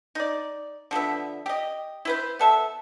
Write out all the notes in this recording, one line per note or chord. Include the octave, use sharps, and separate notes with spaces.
D#4 D5
D3 F3 B3 E5
G4 D#5
E4 B4 C5
B3 A4 E5